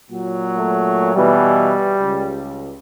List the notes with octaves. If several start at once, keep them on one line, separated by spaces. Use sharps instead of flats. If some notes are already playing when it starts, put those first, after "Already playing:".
A#2 F#3
A3
B2 E3 G3
C#2